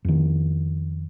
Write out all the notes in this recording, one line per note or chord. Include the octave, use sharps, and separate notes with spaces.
F2 D#3